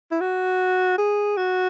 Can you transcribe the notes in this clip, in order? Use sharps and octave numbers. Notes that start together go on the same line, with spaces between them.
E4
F#4
G#4
F#4